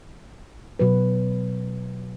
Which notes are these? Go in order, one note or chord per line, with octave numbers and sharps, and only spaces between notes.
B2 F#3 B4